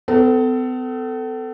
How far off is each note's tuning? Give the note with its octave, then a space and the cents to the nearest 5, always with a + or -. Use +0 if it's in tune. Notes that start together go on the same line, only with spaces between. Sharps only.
B3 +45 A4 +10